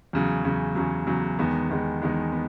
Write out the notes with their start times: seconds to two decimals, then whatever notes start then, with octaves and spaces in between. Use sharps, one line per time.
0.13 E2 C#3 F#3
0.45 E2 C#3 F#3
0.75 E2 C#3 F#3
1.07 E2 C#3 F#3
1.39 E2 D#3 G#3 B3
1.70 E2 D#3 G#3 B3
2.02 E2 D#3 G#3 B3
2.32 B3